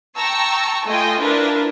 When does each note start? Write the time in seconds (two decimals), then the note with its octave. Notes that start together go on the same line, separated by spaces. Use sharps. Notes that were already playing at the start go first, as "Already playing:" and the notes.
0.16 G5 A5 A#5 C#6 E6
0.87 A3 F4 D#5 G5 G#5
1.21 D4 E4 F4 A#4 B4